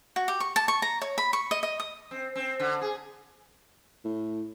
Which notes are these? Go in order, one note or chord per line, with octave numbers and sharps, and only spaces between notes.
F#4
G4
C#6
A5
C#6
A#5
C#5
B5
C#6
D#5
D#5
D#6
C4
C4
D3
G#4
A2